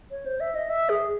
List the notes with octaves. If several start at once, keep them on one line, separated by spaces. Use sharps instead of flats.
C#5
C5
E5
D#5
E5
G#4